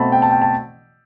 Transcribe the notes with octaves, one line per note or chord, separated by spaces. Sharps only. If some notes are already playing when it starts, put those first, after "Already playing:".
Already playing: B2 A3 C4 A5 B5
G5
A5
G5
A5